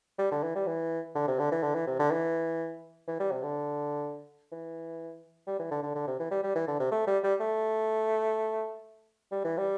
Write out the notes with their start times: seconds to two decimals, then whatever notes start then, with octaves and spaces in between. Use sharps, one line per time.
0.18 G3
0.32 D3
0.43 E3
0.55 G3
0.67 E3
1.15 D3
1.27 C3
1.39 D3
1.52 E3
1.63 D3
1.75 E3
1.87 C3
1.99 D3
2.11 E3
3.07 E3
3.20 G3
3.31 C3
3.43 D3
4.52 E3
5.47 G3
5.59 E3
5.71 D3
5.83 D3
5.95 D3
6.07 C3
6.19 E3
6.31 G3
6.43 G3
6.55 E3
6.67 D3
6.79 C3
6.91 A3
7.07 G3
7.23 G3
7.40 A3
9.32 G3
9.44 E3
9.58 G3